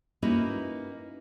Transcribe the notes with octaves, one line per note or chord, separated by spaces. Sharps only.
A#3 C#4 D#4 E4 F#4 B4